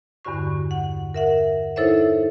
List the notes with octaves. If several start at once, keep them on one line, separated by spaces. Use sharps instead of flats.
E2 G2 D3 F#4 C#6
F#5
A#4 E5 F#5
D#4 E4 A4 C5 C#5 E5